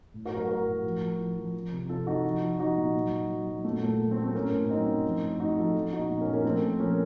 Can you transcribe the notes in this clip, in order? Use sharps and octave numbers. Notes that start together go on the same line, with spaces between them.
A2
F#4 A#4
F#3
F#4 A#4
A2 F#4 A#4
A2
F3
F3
F3
F3
F3
C3
C3 F4 A4
C3 D#4 F#4
F3
F3
F3 D#4 F#4
A#2
F#3
F#3
F#3
F#3
A#2 A3
A#2 A3
F#3
A3 C4
F#3
A3 C4
A2 A#3 C#4
A2
F#3 C4 D#4
A2
F3
A2
A2 D#4 F#4
F3 F4 A4
F3
A#2 D#4 F#4
A#2
A#3 C#4
A#2
A#3 C#4
F3 A3 C4
A#2
F3 A#3 C#4